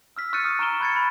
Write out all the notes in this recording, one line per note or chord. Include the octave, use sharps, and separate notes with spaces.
E6 F6 B6
C#6 F6 F#6 A6 C#7 D#7
D#6 C#7
A#5 C#6 D7 E7 G7
B5 F#6 G#6 A6 C#7
B5